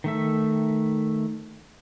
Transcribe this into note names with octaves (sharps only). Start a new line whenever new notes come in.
D#3 A3 E5